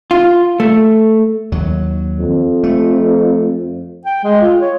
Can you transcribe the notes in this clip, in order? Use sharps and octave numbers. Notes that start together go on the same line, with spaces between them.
F4
A3
D#2 F#3
F2
A3
G5
G#3
F4
C#5